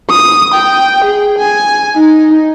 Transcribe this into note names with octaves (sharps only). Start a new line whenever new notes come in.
D#6
G5
G#4
G#5
D#4